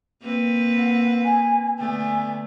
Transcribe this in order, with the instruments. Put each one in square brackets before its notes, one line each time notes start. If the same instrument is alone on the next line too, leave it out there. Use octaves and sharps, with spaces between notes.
[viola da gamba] A#3 C4 B4
[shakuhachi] F#5
G#5
[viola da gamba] D3 A3 B3 [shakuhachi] G#5